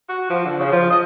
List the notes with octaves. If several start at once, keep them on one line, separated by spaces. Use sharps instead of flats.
F#4
F3
D3
C#3
F3
D#5